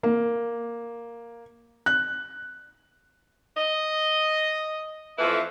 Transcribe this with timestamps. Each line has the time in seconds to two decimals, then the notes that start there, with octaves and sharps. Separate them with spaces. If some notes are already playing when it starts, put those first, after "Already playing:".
0.03 A#3
1.86 F#6
3.57 D#5
5.18 F2 E3 A3 E4 F4 B4